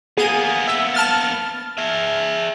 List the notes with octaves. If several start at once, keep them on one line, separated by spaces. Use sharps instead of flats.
A#3 B3 G#4 D#7
E5
A5 F6 A6
G#4 E5